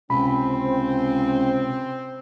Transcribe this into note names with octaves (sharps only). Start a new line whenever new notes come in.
C#2 C3 C4 B5